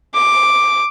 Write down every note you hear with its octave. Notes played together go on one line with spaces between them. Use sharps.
D6